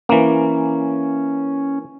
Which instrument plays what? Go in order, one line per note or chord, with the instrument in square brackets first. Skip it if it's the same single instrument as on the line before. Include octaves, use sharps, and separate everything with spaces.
[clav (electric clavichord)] E3 A#3 [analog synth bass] C#4